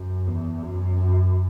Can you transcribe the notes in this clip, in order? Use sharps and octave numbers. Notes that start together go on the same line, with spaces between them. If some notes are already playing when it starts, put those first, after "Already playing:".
Already playing: F#2
E2
F#2